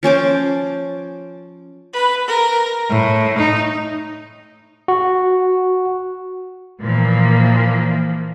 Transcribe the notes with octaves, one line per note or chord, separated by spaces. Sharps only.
F3 C#4 C5 D6
B4
A#4
A2
D#4
F#4
A#2 E3 F3 A#3